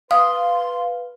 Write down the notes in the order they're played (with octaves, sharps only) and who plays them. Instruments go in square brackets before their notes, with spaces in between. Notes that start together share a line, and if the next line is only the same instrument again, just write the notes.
[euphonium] B4 [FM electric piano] F5 [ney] C6 [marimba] D#6